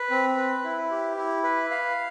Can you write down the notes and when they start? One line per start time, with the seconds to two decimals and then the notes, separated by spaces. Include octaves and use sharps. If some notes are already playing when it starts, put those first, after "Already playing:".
Already playing: B4
0.10 C4
0.37 B4
0.64 E4
0.91 G4
1.17 E4
1.43 B4
1.71 F5